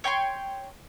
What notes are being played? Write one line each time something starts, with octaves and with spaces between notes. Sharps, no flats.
C#5 G5 B5 C6